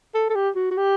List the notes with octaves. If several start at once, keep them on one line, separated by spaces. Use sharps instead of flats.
A4
A4
G4
F#4
F#4
G4